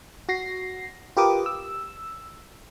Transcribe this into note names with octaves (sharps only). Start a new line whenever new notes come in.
F#4 A#6 C7
F4 G4 A#4 B4 D6 D#6
E6